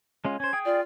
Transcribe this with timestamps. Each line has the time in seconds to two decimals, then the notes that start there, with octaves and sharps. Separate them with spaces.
0.25 G#3 C#4 F4
0.40 C#4 C5 G#6
0.53 G#4 G5 D#6
0.65 F4 D5